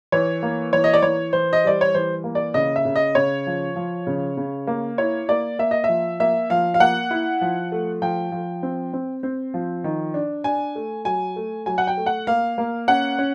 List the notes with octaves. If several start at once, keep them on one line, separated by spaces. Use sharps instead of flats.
E3 C#5
A#3
E3 C#5
D#5
D5
E3 C#5
E3 C5
D#5
G3 D5
C#5
E3 C5
A#3
D5
C#3 D#5
E5
C#3
D#5
C#3 C#5
F3
F3
C#3
C#3
A#3
E4 C#5
A#3 D5
A#3 E5
D#5
F3 E5
A#3 E5
F3 F5
F5
A#3 F#5
E4
F3
A3
F3 G5
F3
C4
C4
C4
F3
D#3
D4
D4 G#5
A3
F#3 G#5
A3
F#3 G#5
F#5
G5
A3
F#5
A#3 F5
A#3
C#4 F#5
C#4